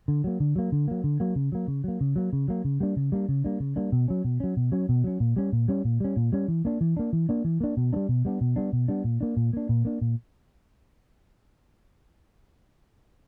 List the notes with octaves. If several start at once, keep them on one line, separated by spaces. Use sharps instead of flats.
D3
F#3 A#3
D3
F#3 A#3
D3
F#3 A#3
D3
F#3 A#3
C#3
F#3 A#3
C#3
F#3 A#3
C#3
F#3 A#3
C#3
F#3 A#3
C#3
G3 A#3 D4
C#3
G3 A#3 D4
C#3
G3 A#3 D4
C#3
G3 A#3 D4
B2
F#3 C#4
B2
F#3 C#4
B2
F#3 C#4
B2
F#3 C#4
A#2
G3 C#4
A#2
G3 C#4
A#2
G3 C#4
A#2
G3 C#4
E3
A#3 D4
E3
A#3 D4
E3
A#3 D4
E3
A#3 D4
B2
G3 B3 D4
B2
G3 B3 D4
B2
G3 B3 D4
B2
G3 B3 D4
A#2
A#3 D4
A#2
A#3 D4
A#2
A#3 D4
A#2